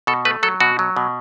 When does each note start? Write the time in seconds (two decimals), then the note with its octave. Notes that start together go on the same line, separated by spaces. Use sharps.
0.07 B2 A4
0.25 A3 B4
0.43 F#3 A4
0.60 B2 F#4
0.79 F#3
0.96 B2